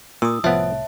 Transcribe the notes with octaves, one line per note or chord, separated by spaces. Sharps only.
A#2 D#6 E6
C2 A2 F3 B3 C#5 E5 A5